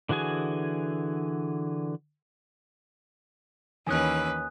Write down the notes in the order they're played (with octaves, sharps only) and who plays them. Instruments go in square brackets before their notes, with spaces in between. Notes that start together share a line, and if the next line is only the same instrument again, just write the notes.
[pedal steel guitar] D3 E3 F#4 G#4 G#5
[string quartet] D#2 C#4 B4 [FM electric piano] D#3 E3 [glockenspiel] G#5 D#6 F#6